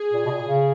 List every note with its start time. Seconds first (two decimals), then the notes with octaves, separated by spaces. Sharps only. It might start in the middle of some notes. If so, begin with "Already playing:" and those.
Already playing: G#4
0.13 A#2
0.26 B2
0.31 A#2
0.48 C#3